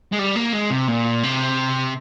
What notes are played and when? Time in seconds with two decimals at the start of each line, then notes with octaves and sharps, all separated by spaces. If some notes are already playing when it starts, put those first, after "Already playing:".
0.13 G#3
0.19 G3
0.36 A#3
0.53 G#3
0.70 C3
0.88 A#2
1.24 C3